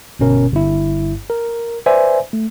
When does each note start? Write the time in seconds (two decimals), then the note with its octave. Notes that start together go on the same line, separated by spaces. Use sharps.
0.19 G1 B2 C#4 A#4
0.52 G1 G2 E4
1.30 A#4
1.86 B4 C5 D5 E5 G#5
2.33 A3